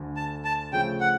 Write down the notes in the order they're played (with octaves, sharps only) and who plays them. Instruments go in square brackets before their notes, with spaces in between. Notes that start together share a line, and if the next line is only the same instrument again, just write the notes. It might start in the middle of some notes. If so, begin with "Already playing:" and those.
Already playing: [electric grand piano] D2 D3
[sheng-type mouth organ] A5
A5
[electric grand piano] C#3 F3 A3 [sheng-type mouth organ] G5
[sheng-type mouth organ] F#5